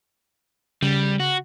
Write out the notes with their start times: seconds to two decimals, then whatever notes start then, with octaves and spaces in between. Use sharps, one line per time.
0.82 C#3 G3
1.20 F#4